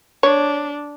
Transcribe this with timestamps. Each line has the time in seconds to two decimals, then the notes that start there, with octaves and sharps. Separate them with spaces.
0.23 D4 C#5